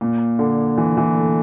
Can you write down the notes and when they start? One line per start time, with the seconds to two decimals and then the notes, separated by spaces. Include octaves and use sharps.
0.01 A#2
0.39 D3
0.78 E3
0.97 E3
1.16 A3